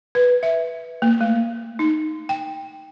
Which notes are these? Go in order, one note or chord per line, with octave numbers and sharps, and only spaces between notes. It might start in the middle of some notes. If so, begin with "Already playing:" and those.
B4
E5
A#3
A3
D#4
G5